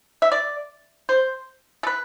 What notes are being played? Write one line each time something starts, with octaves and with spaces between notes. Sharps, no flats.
E5
D5
C5
A4
B4